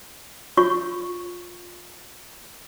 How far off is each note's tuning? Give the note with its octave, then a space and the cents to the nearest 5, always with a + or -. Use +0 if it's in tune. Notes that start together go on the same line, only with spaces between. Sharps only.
F4 +15 C#5 +0 C#6 +0